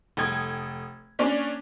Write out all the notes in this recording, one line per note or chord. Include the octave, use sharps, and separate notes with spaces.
F1 A4 G5 D#6 G#6
A#3 C#4 D4 C#5 D5